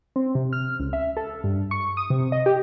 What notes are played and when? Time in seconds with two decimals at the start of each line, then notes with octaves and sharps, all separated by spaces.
0.16 C4
0.35 C3
0.53 F6
0.79 C#2
0.93 E5
1.17 A4
1.44 G2
1.71 C#6
1.97 D#6
2.10 C3
2.32 D#5
2.46 G4